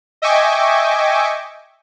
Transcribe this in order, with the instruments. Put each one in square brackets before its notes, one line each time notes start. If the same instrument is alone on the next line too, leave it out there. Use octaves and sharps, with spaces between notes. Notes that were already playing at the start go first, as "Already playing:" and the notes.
[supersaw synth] D#5 E5 G5 G#5 C#6 D6